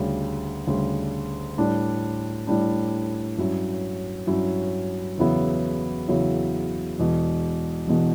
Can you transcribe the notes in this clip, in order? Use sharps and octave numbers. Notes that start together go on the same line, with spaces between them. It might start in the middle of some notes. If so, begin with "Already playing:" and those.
Already playing: D2 C#3 G3
D2 C#3 G3
A2 G3 D4
A2 G3 D4
G2 F#3 C#4 E4
G2 F#3 C#4 E4
E2 C#3 F#3 B3 E4
E2 C#3 F#3 B3 E4
E1 E2 B2
E1 E2 B2